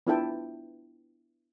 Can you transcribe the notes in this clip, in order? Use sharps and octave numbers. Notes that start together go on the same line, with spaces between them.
B3 D4 E4 F4 A4 G5